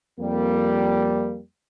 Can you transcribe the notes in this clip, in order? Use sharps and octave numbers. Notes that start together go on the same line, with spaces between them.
F2 G3 A#3